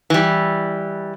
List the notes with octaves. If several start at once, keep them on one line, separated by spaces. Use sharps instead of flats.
E3 G3